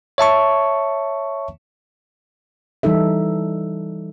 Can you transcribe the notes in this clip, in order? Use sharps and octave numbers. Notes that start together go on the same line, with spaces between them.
C#5 E5 A5 C#6
E3 G3 D#4 A4 E5